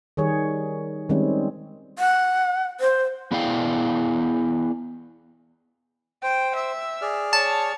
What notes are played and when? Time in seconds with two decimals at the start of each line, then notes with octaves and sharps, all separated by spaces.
0.17 D#3 G3 G#4 C#5
1.09 D#3 G3 G#3 C4 C#4
1.99 F#5
2.80 C5
3.31 B3 E4 G#4 D5 F5 G5
6.23 C5 G5
6.56 E5
7.02 G#4 D5 F6
7.33 C#5 A5